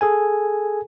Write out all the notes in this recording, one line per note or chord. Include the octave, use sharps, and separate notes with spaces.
G#4 A4 G#5